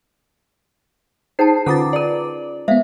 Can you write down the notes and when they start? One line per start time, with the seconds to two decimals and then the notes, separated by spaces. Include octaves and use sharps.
1.39 D#4 G#4 C5 G5 A5 C7
1.66 D3 C#4 F4 B4 A#5 D6 D#6 A6
1.93 G#4 A#4 D5
2.68 G#3 B3 C5 E5 F5